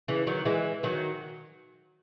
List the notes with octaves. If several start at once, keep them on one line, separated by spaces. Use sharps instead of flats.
C#3 E3
D#3 F#3
E3 G#3
D#3 F#3